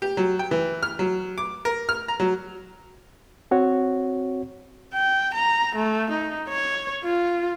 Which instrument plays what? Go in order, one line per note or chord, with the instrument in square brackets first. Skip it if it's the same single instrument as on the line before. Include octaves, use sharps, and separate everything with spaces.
[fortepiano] G4
F#3
G5
E3
F6
F#3
D6
A#4
F6
A#5
F#3
[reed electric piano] C4 F#4 C#5
[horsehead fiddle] G5
A#5
A3
D#4
C#5
F4